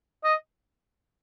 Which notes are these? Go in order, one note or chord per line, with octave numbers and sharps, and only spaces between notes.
D#5